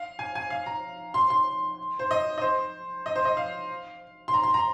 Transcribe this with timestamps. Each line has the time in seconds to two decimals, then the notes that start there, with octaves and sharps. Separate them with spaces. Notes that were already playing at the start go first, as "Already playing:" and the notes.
Already playing: F5
0.19 G#5
0.35 G#5
0.50 F5
0.66 A#5
1.14 C6
1.30 C6
1.99 C5
2.11 D#5
2.38 D#5
2.42 C5
3.06 D#5
3.16 C5
3.25 D#5
3.37 F5
4.28 C6
4.34 A#5
4.43 C6
4.54 A#5